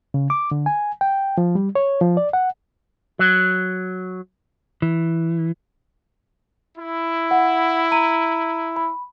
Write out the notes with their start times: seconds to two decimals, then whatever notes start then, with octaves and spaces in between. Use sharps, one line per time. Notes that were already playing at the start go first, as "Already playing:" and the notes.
0.14 C#3
0.30 D6
0.51 D3
0.66 G#5
1.01 G5
1.38 F3
1.55 G3
1.75 C#5
2.01 F3
2.17 D5
2.33 F#5
3.19 F#3
4.82 E3
6.78 E4
7.31 F#5
7.92 A#5 D#7
8.76 B5